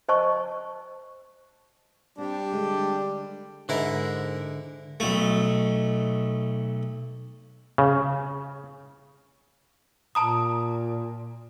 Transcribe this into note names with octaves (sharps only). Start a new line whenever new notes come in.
C5 D#5 A5 C#6
G3 C4 D4 G4
D3 G#3
G#2 D3 E4 A#4
B1 A3
C#3
A#2 A5 A#5 D#6